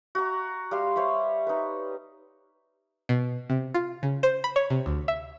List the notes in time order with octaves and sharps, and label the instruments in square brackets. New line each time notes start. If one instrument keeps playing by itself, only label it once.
[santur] F#4 A#5
G3 F5 C6
C5 C#5 E5 B5
D#4 B4
[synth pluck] B2
C3
F4
C#3
C5
B5
C#5
C3
D2
E5